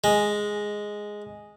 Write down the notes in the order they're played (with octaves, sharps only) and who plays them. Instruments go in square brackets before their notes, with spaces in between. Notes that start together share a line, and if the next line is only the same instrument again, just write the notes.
[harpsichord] G#3